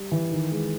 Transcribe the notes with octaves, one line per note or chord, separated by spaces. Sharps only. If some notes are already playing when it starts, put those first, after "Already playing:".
Already playing: G3
E3
D#3
G#3